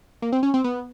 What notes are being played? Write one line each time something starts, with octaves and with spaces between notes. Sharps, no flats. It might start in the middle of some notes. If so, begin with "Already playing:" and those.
A#3
C4
C#4
C4
B3